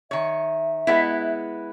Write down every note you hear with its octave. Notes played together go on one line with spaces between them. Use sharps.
D#3 C#5 E5
G#3 B3 E4